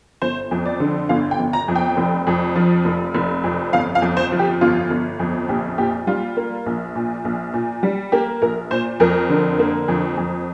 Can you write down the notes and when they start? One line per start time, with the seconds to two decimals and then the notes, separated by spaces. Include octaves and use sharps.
0.22 G1 C5
0.51 F2
0.66 D5
0.80 D3
1.09 G1 F5
1.31 G5
1.39 G1
1.53 A#5
1.68 F2
1.75 G5
1.97 F1
2.27 F2
2.56 F3
2.85 F1
3.14 F1
3.44 F2
3.73 G1 F5
3.95 F5
4.02 F2
4.17 C5
4.32 F3
4.39 G4
4.61 G1 F4
4.90 G1
5.19 F2
5.49 A#1 G4
5.78 A#2 G4
6.07 G3 F4
6.37 A#3
6.66 A#1
6.95 A#2
7.25 A#1
7.54 A#2
7.83 G3
8.12 A#3 G4
8.42 A#1 A#4
8.71 A#2 C5
9.00 F2 A#4
9.29 D3
9.59 A#3
9.88 F2
10.17 F2